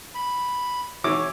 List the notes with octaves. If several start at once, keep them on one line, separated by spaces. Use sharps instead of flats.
B5
E3 F#4 C#5 D6